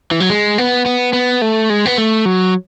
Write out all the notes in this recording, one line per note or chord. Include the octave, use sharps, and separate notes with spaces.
E3
F#3
G#3
B3
B3
B3
A3
G#3
B3
A3
F#3